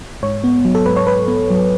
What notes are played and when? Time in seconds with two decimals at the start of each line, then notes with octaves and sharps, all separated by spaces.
0.23 G#2 C#5
0.44 B3
0.65 F#3
0.75 A4
0.86 G#2 B4
0.96 C#5
1.07 G#2 B4
1.28 B3
1.50 F#3